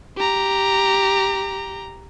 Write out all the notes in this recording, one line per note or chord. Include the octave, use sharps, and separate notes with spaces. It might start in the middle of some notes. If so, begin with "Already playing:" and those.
G4 A#5